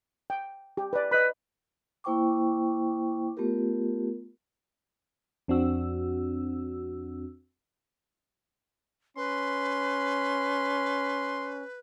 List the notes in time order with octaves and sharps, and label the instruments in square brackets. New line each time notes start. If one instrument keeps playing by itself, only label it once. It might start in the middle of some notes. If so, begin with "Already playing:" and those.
[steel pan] G5
G4
B4 D5
[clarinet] B4 [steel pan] D#5 B5
[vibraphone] A#3 E4 C5 G5 C#6 D6
A3 B3 F4 G4 A#4
[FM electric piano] F2 C4 D4 F#4 E6
[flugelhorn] C#4 [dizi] B4 [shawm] C6